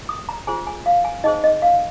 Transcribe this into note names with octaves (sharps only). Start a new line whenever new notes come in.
D#6
A#5
F4 G#4 C5 G#5
G#5
F5
G#5
D#4 G#4 C5 D#5
D#5
F5